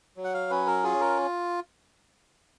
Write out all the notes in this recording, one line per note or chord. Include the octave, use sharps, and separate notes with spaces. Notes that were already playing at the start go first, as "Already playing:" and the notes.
F#3
F#5
F5
C#4 B4
A#4
F4 G#4
A#4